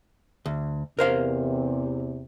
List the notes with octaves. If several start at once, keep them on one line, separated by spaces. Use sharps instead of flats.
D2
E2 C3 A#4 C5 F5